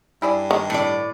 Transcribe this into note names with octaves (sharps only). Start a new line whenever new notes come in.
G2 E4 G#4 D5
D#3
A2 D4 D5